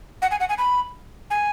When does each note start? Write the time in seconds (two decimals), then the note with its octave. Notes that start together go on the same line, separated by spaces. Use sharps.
0.22 F#5
0.31 G#5
0.40 F#5
0.49 G#5
0.58 B5
1.30 G#5